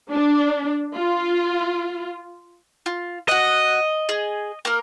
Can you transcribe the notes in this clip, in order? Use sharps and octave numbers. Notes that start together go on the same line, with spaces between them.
D4
F4
F4
F#4 D#5 F#5
G#4
A#3 A#4